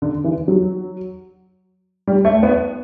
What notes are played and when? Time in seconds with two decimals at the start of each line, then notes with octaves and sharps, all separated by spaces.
0.02 D3
0.24 E3
0.48 F#3
2.07 G3
2.25 A3
2.43 B3